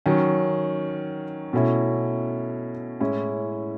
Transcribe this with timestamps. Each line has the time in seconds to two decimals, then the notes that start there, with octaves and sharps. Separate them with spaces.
0.06 D#3 F#3 C#4
1.53 B2 A3 C#4 E4
3.00 A2 G#3 C#4 E4